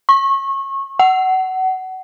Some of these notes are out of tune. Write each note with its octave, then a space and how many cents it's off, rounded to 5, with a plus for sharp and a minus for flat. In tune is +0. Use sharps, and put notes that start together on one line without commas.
C#6 -25
F#5 +25